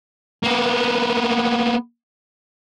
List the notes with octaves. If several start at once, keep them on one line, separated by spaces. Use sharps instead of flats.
A#3 B3